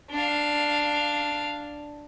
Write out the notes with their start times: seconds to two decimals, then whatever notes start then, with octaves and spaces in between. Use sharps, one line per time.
0.11 D4 F5